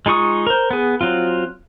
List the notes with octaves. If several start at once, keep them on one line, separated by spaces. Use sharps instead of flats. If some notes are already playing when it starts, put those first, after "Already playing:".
G#3 D#4 F4 C#6 D#6
A#4 C5
B3 G#4
F#3 C4 F4